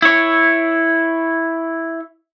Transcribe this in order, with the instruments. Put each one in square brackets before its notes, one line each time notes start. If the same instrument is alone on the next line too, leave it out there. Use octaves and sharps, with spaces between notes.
[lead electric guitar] E4 C#5